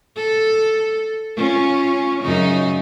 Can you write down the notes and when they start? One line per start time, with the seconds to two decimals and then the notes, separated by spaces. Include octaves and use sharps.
0.17 A4
1.36 C#4 F4
2.23 F#2 C#3 D#4